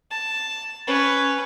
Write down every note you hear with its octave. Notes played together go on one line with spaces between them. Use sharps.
A5
C#4 B4